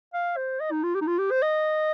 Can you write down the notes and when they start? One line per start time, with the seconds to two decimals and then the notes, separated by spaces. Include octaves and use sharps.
0.14 F5
0.37 C5
0.60 D#5
0.72 D#4
0.83 F4
0.95 G4
1.01 D#4
1.07 F4
1.19 G4
1.31 C5
1.42 D#5